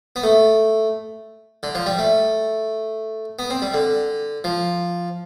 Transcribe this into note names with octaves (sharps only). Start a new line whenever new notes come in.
B3
A3
D3
F3
G3
A3
B3
C4
G3
D3
F3